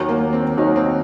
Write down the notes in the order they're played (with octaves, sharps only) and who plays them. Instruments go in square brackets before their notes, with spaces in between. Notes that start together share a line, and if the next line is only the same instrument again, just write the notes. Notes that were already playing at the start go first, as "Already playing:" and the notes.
Already playing: [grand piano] D#2 D#3 F#3
[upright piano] A#3
C4
[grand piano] D#2 D#3 F#3 [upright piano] D#4
[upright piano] C4